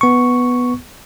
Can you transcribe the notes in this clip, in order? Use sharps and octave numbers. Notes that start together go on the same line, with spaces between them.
B3 C#6